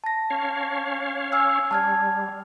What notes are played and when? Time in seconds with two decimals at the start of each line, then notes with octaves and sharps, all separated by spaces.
0.04 A5 A#6
0.30 C#4 C#5 F5
1.32 G#5 E6 F6
1.71 G3 A5 F6 G#6